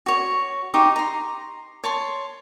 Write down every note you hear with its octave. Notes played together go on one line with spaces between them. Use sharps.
F#4 C#5
D#4 G4 C#6 D#6
A#5 C6
C#5 A5 C6